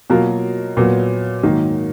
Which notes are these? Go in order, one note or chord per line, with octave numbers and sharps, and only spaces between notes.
B2 F#3 A#3 F4 A#4
A#2 F#3 B3
G#2 D#3 F#3 A#3